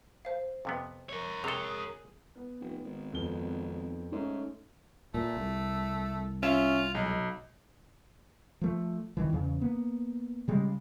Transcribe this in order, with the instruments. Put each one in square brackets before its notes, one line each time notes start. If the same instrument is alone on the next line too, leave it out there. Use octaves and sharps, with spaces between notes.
[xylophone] C5 F5
[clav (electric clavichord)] F2 C3 B3
[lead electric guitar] A#4 C#5
[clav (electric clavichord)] C3 A4 [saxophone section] G#4 [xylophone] F7 G7
[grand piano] B3
[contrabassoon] F1
G#1
[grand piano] F2 B3 G7
[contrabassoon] G#2 [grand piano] A3 C#4
[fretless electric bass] A#2 [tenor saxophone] A3
[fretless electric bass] C2
[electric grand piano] C#4 E5 E7 [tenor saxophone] F4
[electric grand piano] B1 [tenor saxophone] G#3
[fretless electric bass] F3 A3
D#1 D#3 E3
E2 C#3
A#3 B3
C#3 G3 G#3